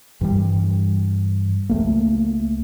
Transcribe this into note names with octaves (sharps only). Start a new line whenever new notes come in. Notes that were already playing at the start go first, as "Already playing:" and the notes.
G2 E3 G3
C#2 A3 A#3